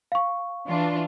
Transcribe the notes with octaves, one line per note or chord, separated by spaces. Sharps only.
F5 C#6
E3 D4 F4